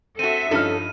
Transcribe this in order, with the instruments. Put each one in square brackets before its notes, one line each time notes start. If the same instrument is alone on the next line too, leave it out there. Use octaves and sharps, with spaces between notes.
[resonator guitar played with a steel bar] C4 F#4 [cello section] A4 E5 [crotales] D#7
[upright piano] G2 F3 F6 [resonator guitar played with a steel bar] C#4 A4 [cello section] D#4